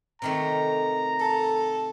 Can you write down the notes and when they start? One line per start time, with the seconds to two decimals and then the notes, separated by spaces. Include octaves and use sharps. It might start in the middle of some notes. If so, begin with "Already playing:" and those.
0.22 C3 D#3 A3 A#5
1.20 A4